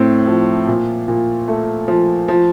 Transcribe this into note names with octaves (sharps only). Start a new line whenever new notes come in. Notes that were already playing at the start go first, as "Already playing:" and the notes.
Already playing: A2 C4
F3
A#2
A#2
A3
F3
F3